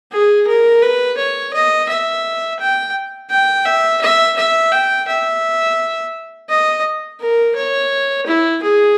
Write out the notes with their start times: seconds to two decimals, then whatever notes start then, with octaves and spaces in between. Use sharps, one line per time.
0.11 G#4
0.47 A#4
0.82 B4
1.17 C#5
1.53 D#5
1.89 E5
2.59 G5
3.30 G5
3.65 E5
4.01 E5
4.37 E5
4.71 G5
5.07 E5
6.49 D#5
7.20 A#4
7.56 C#5
8.26 E4
8.62 G#4